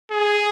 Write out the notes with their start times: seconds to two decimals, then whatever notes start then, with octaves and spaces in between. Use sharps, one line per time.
0.11 G#4